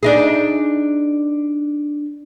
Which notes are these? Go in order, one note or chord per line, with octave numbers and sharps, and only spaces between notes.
D4 D#4 G#4